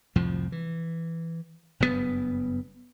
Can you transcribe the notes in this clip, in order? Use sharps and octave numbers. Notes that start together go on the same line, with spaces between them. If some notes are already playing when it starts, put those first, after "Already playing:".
C2 F2 A2 F3
E3
F#1 G2 B2 B3